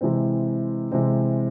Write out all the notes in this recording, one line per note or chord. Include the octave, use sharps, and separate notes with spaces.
C3 E3 G#3 C4
C3 E3 G#3 C4